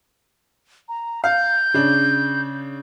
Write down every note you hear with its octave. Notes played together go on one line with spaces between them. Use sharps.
A#5
F5 G6
C#3 D4